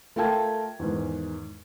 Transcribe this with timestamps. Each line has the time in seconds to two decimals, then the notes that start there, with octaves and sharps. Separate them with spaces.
0.16 A3 F4 A#4 G5 A5 G#6
0.79 E2 G#2 D#3